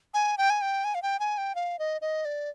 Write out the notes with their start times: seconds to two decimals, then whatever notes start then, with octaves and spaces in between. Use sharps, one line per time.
0.14 G#5
0.38 G5
0.50 G#5
0.62 G5
0.84 G#5
0.95 F5
1.02 G5
1.20 G#5
1.38 G5
1.55 F5
1.79 D#5
2.01 D#5
2.25 D5